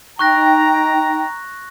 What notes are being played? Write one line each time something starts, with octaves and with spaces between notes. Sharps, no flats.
D#4 G5 A#5 C#6 F#6 A#6